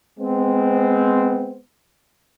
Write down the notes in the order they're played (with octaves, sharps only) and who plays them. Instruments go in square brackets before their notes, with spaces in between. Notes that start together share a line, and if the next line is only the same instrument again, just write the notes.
[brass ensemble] G#3 B3 C4